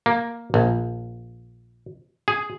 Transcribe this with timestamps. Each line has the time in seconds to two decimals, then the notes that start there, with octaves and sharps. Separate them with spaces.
0.06 A#3
0.54 A#1
2.28 G#4